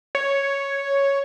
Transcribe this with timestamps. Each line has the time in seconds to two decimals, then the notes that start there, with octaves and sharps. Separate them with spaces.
0.15 C#5